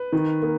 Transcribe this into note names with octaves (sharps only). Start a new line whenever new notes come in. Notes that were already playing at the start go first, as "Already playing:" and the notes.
Already playing: B4
D#3
A#3